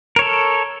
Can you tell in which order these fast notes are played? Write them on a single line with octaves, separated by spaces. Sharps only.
A#4 C#5 A4